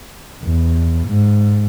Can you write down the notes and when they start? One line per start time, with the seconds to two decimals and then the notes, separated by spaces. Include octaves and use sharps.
0.43 E2
1.07 G#2